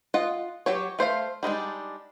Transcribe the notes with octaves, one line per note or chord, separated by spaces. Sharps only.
F4 D#5 F#5
F#3 G4 C#5
A3 C5 D5 F5
G3 G#3 D4 D#4